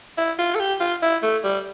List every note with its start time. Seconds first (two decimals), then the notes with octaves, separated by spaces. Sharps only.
0.18 E4
0.39 F4
0.56 A4
0.60 G4
0.81 F4
1.03 E4
1.23 A3
1.44 G3